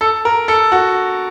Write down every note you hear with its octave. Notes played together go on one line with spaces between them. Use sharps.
A4
A#4
A4
F#4